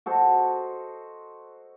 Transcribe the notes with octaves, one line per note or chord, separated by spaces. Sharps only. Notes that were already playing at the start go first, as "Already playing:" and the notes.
F#4 A4 C5 D#5